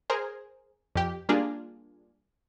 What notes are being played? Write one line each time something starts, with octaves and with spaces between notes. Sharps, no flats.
G#4 A#4 C5
F2 G4
G3 A#3 D4 F4 G#4